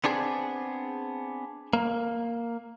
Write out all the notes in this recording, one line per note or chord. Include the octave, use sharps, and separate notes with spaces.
B3 C4 D4 G#4
A#3